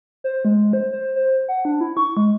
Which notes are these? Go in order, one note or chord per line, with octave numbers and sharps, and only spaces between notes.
C5
G#3
C5
C5
C5
F#5
D4
E4
C#6
G#3